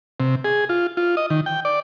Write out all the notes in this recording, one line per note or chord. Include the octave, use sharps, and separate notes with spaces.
C3
G#4
F4
F4
D#5
D#3
G5
D5